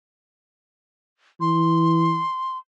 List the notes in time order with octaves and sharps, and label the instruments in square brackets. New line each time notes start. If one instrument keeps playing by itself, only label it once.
[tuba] E3 [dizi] C6